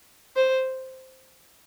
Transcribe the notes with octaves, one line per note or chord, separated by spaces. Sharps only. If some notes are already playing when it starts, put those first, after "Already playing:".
C5